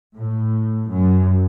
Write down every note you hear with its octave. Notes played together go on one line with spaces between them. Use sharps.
A2
F#2